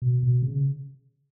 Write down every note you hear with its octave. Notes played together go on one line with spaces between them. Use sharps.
B2
B2
C#3